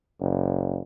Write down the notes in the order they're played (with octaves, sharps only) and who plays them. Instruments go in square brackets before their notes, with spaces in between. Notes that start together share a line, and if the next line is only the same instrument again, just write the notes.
[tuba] F#1